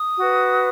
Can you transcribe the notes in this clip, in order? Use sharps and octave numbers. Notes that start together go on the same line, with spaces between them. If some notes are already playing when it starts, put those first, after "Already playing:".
Already playing: D#6
F#4 B4